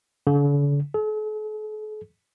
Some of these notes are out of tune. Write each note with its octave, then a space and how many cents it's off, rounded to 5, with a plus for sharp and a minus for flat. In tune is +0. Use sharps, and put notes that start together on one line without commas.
D3 -45
A4 -45